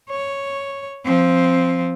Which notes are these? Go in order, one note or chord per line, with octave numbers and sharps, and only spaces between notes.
C#5
F3 C4